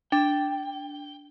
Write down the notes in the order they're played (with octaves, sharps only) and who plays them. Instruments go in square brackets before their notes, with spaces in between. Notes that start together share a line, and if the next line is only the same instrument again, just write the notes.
[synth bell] D4 [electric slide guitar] G5